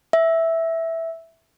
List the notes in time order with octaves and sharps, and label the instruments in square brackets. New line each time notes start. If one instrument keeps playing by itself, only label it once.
[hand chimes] E5